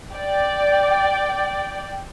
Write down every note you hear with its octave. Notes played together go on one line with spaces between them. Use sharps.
D5 G5